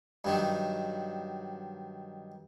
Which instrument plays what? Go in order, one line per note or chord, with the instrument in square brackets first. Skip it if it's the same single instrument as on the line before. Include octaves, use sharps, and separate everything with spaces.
[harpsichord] G2 D#3 F#3